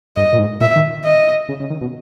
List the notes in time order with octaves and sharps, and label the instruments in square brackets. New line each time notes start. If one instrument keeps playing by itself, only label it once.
[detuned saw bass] G2 [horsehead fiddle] D#5
[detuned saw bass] A#2
G#2
[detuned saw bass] A#2 [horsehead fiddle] E5
[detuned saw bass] D#3
[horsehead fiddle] D#5
[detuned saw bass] C#3
C#3
D#3
B2